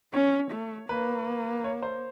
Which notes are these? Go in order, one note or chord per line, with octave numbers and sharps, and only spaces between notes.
C#4 C#5
A3
A#3 B4
C#5
C5